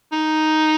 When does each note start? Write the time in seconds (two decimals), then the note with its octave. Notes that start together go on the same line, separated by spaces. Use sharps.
0.13 D#4